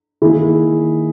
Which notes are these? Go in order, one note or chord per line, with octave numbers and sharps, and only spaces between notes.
D#3 A#3 E4 G#4